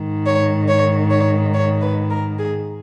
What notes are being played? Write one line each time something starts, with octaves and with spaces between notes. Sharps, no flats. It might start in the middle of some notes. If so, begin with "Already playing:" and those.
Already playing: G#2 D#3
C#5
C#5
C#5
C#5
B4
A#4
G#4